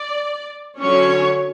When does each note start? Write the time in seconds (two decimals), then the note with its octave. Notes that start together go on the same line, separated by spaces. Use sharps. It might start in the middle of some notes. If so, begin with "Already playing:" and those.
Already playing: D5
0.80 D3 F#3 C#4 C#5